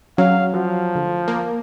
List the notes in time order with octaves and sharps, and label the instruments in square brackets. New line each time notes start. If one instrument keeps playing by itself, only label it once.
[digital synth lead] F#3 [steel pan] C#4 [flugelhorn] F5
[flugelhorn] F3 [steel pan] F#4
[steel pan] D3
[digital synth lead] A#3